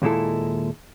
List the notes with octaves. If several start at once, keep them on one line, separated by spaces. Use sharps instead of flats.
D#2 A#2 G#3 E4 A4